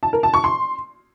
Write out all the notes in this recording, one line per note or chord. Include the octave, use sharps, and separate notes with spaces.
A5
A#4
A5
C#6
C6